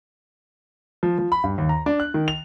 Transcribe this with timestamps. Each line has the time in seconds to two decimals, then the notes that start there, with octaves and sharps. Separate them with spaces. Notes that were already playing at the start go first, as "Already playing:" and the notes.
1.03 F3
1.18 F3
1.32 B5
1.44 G2
1.58 D#2
1.69 A#5
1.86 D4
2.00 F#6
2.14 D#3
2.28 F7